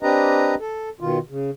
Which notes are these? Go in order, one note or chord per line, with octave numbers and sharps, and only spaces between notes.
C4 D4 G4 B4 D#5 A#5
A4
B2 D#3 F4
C#3